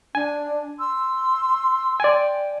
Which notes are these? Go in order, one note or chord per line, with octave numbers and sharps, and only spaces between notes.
D4 G#5
C6 E6
D5 G5 G#5